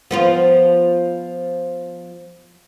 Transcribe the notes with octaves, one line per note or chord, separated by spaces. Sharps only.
F3 B3 F4